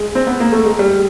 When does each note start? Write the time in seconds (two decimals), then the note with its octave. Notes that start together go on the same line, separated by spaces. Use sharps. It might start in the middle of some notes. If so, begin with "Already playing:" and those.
Already playing: G#3
0.15 C4
0.27 B3
0.40 A#3
0.52 A3
0.65 G#3
0.79 G3